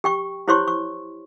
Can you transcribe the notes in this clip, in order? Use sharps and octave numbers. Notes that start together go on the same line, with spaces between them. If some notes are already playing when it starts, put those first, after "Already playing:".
G4 G5 C#6
E4 G4 C5 C#5 C6 C#6
C#6